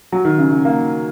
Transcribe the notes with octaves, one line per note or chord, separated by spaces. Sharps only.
F#3
D#3
C#3
C#3
A#3